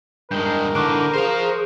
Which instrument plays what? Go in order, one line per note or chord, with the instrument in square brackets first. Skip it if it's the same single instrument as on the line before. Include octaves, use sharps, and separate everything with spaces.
[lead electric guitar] G2 G#3 [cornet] A#4 [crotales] G6
[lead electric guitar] D3 E3 [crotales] C#6 F#6 D7 [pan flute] D6
[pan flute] G#4 [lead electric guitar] C5 F5